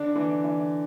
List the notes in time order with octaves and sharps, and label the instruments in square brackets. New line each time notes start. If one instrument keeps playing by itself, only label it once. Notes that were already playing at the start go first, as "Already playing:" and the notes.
Already playing: [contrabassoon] D3 [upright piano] D4
[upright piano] E3
E3